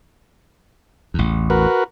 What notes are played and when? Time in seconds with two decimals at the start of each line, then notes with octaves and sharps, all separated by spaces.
1.14 A1 E2
1.50 F#4 A#4 B4